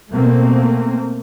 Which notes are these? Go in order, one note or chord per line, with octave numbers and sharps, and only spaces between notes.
B2 A3 A#3 C4